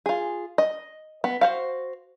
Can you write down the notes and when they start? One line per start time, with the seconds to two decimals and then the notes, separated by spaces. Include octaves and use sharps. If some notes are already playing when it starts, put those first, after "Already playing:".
0.06 F4 G#4
0.58 D#5
1.24 B3
1.41 F#4 C5 F5